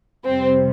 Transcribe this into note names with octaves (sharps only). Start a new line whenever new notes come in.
F2 C3 G3 C4